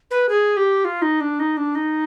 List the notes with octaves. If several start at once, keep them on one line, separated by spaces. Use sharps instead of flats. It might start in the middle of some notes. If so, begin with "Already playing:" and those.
B4
G#4
G4
F4
D#4
D4
D#4
D4
D#4